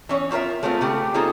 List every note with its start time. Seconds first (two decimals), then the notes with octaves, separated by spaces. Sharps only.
0.09 E3 C#4 C#5
0.31 C4 F4 A4 A#4 E5
0.63 G#3 A3 B3 C4 F4
0.81 C#3 A3 G4
1.14 A#3 C4 D#4 F4 G#4 A4